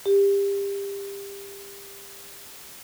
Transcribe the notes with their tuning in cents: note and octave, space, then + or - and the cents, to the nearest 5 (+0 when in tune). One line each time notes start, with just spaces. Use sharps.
G4 +25